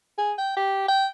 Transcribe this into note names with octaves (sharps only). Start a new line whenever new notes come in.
G#4
G5
G4
G5